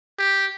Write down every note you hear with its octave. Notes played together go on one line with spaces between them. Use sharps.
G4